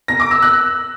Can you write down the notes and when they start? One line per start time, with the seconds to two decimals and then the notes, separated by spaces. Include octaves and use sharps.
0.08 A#6
0.20 D6
0.31 E6
0.42 F#6